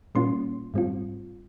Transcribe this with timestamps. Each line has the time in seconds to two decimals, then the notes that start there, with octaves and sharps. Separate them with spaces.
0.15 A#2 G3 A#3 C#4 F4 C6
0.74 G#2 G3 C4 F4